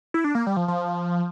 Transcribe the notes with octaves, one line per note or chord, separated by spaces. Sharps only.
E4
D4
A#3
G3
F3
F3